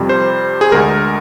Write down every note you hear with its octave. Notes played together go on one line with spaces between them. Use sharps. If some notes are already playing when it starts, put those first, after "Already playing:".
Already playing: F2 C3 G3
C5
G#4
D2 D3 G#3 A#4